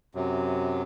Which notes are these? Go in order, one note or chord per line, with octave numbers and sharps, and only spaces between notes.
F#2 C3 F#3